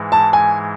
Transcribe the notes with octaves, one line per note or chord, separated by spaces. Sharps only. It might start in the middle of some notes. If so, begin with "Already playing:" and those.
Already playing: G#2 E3 G#3
A5
G#5